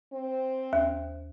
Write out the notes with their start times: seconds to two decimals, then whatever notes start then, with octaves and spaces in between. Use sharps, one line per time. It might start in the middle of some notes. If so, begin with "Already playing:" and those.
0.13 C4
0.73 D#2